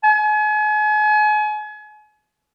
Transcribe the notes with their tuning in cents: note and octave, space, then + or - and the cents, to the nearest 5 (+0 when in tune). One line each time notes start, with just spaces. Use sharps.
G#5 +35